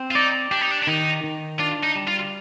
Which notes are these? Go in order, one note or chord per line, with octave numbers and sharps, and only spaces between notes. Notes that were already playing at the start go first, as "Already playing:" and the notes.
Already playing: C4
F4
D#4 D5
D4 G4
D#4
D4
D4
D#3 D#4
D#3
D4 F4
D#4
G3
F4